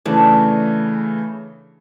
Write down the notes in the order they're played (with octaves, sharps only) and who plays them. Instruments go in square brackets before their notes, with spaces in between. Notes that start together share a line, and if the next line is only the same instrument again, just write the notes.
[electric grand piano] C#3 E3 A3 [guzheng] D4